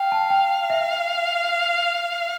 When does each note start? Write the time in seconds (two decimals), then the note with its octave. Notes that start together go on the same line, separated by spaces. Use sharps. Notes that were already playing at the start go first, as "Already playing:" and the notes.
Already playing: F5 G5
0.12 A5
0.30 G5
0.70 E5